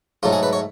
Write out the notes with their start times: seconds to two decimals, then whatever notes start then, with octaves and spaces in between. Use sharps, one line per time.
0.23 G#2 F#3 A3 F4
0.32 G#4
0.43 B4
0.53 C#5